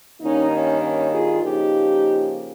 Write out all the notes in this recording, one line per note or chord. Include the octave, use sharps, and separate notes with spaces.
G2 D#3 A#3 C#4 D#4
C#4
C#4
F4 G#4
C#3 F3 A#3 D#4 G4